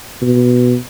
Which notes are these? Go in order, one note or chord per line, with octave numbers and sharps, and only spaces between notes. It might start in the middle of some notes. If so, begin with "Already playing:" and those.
B2